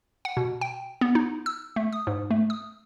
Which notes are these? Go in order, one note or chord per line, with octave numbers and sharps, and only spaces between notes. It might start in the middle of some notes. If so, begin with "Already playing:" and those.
F#5
B2
G5
B3
D#4
E6
A3
D#6
G#2
A3
D#6